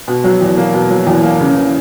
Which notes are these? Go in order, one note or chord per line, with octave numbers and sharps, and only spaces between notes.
B2
F#3
E2
A#3
B2
F#3
E2
A#3
C#3
E3